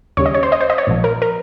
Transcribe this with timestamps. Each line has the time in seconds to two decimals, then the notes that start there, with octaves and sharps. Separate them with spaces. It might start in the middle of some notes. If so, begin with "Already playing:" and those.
0.17 D#2 C#3 G3 C#5
0.26 D#5
0.34 C#5
0.43 C5
0.52 D#5
0.61 C5
0.70 D#5
0.78 C#5
0.87 A#1 A#2 F3
1.04 A#4
1.22 A#4